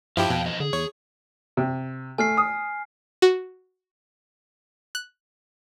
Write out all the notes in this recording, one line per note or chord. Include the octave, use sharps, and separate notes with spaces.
G2 F3 E4 G4 F5 G5 A5
F2 B2
E3 F3 D#5
D3 G#4
E2 C#5
C3
A3 G#5 F6 C7
D#6
F#4
F#6